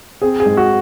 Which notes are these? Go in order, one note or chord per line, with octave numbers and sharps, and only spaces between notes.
C4 G#4
G#4
G#2
F#4